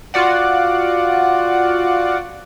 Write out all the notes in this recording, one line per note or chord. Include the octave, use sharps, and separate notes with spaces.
F4 F#4 D5 F#5